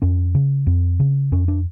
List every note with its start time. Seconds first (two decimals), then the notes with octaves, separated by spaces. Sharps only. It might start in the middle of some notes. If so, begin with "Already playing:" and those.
0.02 F2 C#4
0.35 C#3
0.67 F2 C4
1.00 C#3
1.32 F2 C#4
1.48 D4